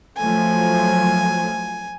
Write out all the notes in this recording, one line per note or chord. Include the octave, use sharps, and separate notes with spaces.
F3 F#3 A3 G#5